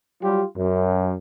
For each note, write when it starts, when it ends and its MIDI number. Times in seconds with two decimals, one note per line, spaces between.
0.23 0.43 54
0.23 0.43 55
0.23 0.43 65
0.23 0.43 67
0.56 1.13 42